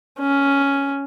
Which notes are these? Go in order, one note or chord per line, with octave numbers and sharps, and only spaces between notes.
C#4